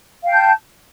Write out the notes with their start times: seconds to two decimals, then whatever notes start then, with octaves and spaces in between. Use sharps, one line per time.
0.23 F5
0.27 G5
0.30 G6
0.33 A5